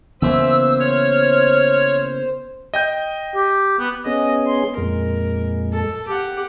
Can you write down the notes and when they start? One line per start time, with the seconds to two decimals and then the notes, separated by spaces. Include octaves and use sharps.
0.22 C#3 E3 A#3 B3 C5 E5 E6
0.80 C#5 F6
2.74 D#5 G5 G6
3.35 G4
3.79 B3
4.06 B3 C#4 G#4 D#5
4.47 C6
4.77 F2 A#2 G#3 A#4
5.72 A4
6.08 G4 F#5